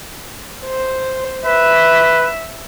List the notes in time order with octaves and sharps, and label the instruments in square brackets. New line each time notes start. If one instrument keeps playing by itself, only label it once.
[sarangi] C5
[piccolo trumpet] B4 [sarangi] E5